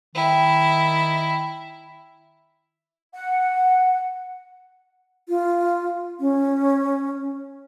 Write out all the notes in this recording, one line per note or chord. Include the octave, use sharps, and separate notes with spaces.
D#3 E4
F#5
F4
C#4